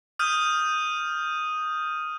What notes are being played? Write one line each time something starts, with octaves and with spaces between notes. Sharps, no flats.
D#6 F6 G6 D#7